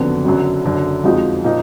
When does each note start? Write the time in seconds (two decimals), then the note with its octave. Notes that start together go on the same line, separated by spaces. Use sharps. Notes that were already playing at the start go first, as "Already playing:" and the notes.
Already playing: F#1 F2 D3 F#3 B3
0.24 F#1 F#2 D3 F#3
0.65 F#1 F#2 D3
1.04 F2 F3 G#3 D#4 F#4
1.44 A#2 F3 A#3 D#4